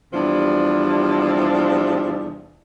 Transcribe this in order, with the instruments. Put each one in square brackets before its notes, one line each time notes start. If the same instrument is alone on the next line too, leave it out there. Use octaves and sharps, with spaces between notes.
[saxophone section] E2 C3 F3 G3 D4